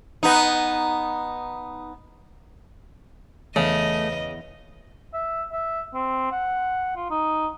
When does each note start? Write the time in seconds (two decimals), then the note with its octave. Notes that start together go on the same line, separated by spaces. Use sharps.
0.23 B3 D#4
3.56 E2 C#3 A3 D#5
5.13 E5
5.52 E5
5.94 C4
6.31 F#5
6.96 F4
7.10 D#4